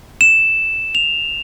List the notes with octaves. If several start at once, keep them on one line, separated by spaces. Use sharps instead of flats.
E7
F7